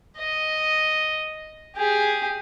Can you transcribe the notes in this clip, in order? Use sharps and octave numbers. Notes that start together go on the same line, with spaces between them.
D#5
G4 G#4